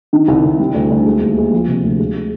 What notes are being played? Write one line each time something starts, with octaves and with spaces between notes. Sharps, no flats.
D#3
C2
C2
G3
D2
D2
G#3
D#2
G#3
F3
C3
D2
G#3
G#3